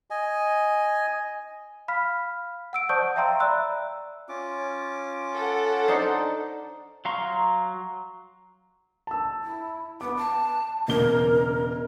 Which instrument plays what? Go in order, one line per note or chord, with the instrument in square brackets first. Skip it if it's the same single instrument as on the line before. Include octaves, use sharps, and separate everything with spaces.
[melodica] D#5 G#5
[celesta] F5 B5 F6 B6
F#5 E6 D7
C5 D5 A5 C#6 D#6 G6
E5 F5 G5 A#5 C6 E6
D5 E5 A#5 B5 E6 F#6
[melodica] C#4 F4 D6
[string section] A4 F#5
[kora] D4 D#4 C5
[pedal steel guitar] F#3 F5 A#5 C6 C#6
[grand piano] A5 E6
[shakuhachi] E4
[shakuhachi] B3 [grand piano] D6
[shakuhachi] A5
[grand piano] E1 C#3 G7 [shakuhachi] A#4